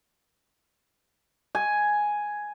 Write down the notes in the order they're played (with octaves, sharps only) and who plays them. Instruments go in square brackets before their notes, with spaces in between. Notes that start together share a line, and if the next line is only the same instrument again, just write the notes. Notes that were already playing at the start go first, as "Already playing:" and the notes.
[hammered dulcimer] G#5